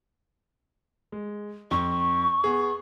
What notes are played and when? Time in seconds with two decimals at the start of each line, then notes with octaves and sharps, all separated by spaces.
1.12 G#3
1.71 F2 C#6
2.44 B3 G#4